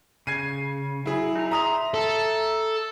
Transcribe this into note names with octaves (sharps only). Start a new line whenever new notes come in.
C#3 G#6 C7 D#7
F#3 E4 G#4
D#4 A#5
E5 A#5 C6 D#6 F7
A4